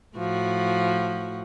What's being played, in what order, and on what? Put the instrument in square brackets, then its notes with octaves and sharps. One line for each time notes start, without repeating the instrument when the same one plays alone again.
[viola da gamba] A2 F3 F#4